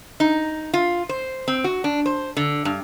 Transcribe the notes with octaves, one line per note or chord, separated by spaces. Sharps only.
D#4
F4
C5
C4
F#4
D4
C5
D3
G2